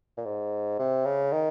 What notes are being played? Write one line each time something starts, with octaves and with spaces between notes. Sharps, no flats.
A#2
G#2
C3
C#3
D#3